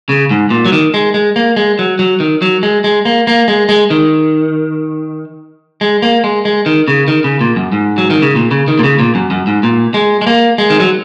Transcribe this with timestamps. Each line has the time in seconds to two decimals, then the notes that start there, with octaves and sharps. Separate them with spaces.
0.09 C#3
0.30 G#2
0.50 A#2
0.65 F#3
0.73 D#3
0.94 G#3
1.14 G#3
1.36 A#3
1.56 G#3
1.79 F#3
1.99 F#3
2.20 D#3
2.42 F#3
2.63 G#3
2.84 G#3
3.05 A#3
3.27 A#3
3.48 G#3
3.69 G#3
3.90 D#3
5.81 G#3
6.02 A#3
6.24 G#3
6.45 G#3
6.66 D#3
6.88 C#3
7.08 D#3
7.24 C#3
7.41 A#2
7.56 F#2
7.72 G#2
7.98 F#3
8.10 D#3
8.22 C#3
8.36 A#2
8.51 C#3
8.68 D#3
8.79 A#2
8.84 C#3
8.99 A#2
9.15 F#2
9.31 F#2
9.47 G#2
9.63 A#2
9.94 G#3
10.21 G#3
10.27 A#3
10.58 G#3
10.70 D#3
10.80 F#3